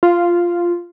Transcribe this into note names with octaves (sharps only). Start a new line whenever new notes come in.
F4